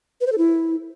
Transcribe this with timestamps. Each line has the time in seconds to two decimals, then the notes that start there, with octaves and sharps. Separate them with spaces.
0.21 B4
0.27 C5
0.32 A4
0.38 E4